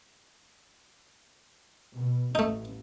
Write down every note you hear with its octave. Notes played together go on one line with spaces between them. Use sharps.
B2
A1 A3 D#4